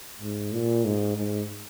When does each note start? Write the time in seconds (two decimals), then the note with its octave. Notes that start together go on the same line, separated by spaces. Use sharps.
0.21 G#2
0.53 A#2
0.85 G#2
1.17 G#2